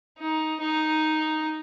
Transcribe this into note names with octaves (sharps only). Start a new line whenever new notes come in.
D#4
D#4